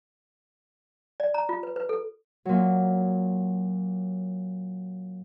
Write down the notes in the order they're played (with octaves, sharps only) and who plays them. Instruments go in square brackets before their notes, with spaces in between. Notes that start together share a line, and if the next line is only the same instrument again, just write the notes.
[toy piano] D5
A#5
F4
B4
B4
A4
[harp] A#2 F#3